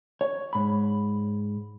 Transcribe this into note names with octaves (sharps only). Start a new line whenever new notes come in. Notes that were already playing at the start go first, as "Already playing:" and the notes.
C#5
G#2 B5